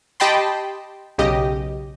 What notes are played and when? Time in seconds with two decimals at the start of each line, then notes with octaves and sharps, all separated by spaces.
0.20 G4 D#5 G5 A5 B5 C6
1.18 B1 C#3 G4 D#5